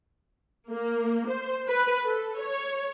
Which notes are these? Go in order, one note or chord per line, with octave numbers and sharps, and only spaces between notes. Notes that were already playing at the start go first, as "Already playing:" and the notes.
A#3
C5
B4
A4
C#5